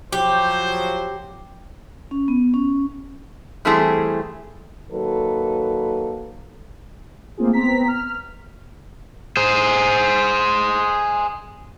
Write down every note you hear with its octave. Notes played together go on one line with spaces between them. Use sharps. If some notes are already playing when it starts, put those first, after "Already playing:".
F3 F#3 G4 C5
C#4
B3
C#4
E3 G3 A3 C4 E4 G#4
D#3 F#3 A#3 A4 B4
A3 A#3 C4 F4 G#4
B3 C4 A#5 B6
F6
G#4 C5